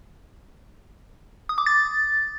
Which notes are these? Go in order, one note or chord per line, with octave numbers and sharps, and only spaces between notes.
D#6
D6
A6